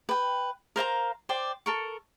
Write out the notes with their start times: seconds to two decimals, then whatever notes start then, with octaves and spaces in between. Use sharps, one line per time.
0.09 B4 G5
0.76 A#4 C5 F5 A#5
1.29 C5 D5 G5
1.66 A4 A#4 C#6